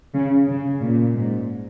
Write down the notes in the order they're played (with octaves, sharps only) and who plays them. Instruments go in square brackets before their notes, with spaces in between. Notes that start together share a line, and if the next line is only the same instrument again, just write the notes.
[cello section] C#3
C#3
A#2
G#2